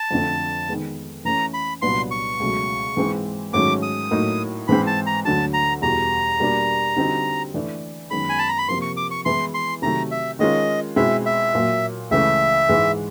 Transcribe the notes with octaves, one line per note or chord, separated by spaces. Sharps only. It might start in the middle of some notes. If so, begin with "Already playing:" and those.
Already playing: A5
F2 D3 F3 A3 C4
D#3 G#3 B3
E3 A3 C#4 A#5
B5
C2 A#2 F#3 B3 D4 C6
C#6
C#2 B2 F#3 A3
G#2 E3 G#3 C4
G#2 D#3 F#3 A3 C#4 D6
D#6
A2 F#3 A#3 D#4
G#2 E3 G#3 C4 B5
A5
A#5
D2 D3 F#3 A5
A#5
E2 B2 G3 A#5
B2 G3 A#3 D4
D3 G3 C4 D#4 F#4
E3 A3 D4
F#2 D#3 G#3 B3 B5
G#5
A5
A#5
B5
C3 F3 A#3 C6
C#6
D6
C#6
E3 G#3 B3 E4 G#4 C6
C6
C3 D#3 F#3 A3 A#5
E5
D#3 G#3 C#4 F4 A#4 D#5
B2 G#3 C4 E4 E5
E5
A#2 F#3 A#3
C#2 C#3 E3 A3 E5
G#2 E3 G#3